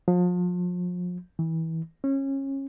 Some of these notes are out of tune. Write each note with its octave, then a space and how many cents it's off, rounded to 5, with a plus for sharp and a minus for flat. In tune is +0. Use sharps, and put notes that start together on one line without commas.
F3 +35
E3 -25
C#4 -25